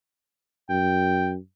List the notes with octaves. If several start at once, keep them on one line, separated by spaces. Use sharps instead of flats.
F#2 G5